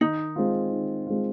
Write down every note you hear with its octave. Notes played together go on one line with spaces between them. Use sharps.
D#3 D#4
G#3 C4 F4
D#3
G#3 C4 F4